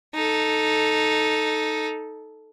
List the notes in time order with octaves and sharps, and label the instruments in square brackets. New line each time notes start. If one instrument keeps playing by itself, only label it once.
[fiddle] D#4 A4